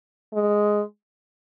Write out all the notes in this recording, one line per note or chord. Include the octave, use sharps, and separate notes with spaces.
G#3